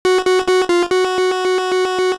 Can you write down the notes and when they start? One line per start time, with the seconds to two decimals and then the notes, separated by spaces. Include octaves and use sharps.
0.05 F#4
0.26 F#4
0.48 F#4
0.69 F4
0.91 F#4